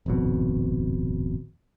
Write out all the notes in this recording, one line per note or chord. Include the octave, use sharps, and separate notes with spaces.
D#1 G#1 F2 B2